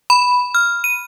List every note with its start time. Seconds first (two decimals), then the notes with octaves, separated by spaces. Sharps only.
0.10 B5
0.55 F6
0.84 D#7